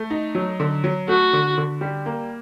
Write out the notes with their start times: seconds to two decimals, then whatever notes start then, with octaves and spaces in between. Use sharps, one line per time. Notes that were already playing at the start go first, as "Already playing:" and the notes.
Already playing: A3
0.10 D#4
0.35 F#3
0.60 D3
0.84 F#3
1.08 A3 F#4
1.33 D3
1.58 D3
1.81 G3
2.06 A#3